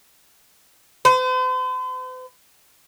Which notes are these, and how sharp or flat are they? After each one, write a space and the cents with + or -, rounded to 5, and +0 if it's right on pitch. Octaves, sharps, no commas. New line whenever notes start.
C5 -45